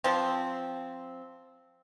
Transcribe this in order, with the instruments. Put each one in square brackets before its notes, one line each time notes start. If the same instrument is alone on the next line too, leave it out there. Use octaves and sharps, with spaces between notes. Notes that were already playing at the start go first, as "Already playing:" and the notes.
[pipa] F3 C4